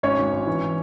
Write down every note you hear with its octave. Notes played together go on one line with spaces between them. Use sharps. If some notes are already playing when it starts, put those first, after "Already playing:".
G#1 C#4 C#5
G#1
G#1
E3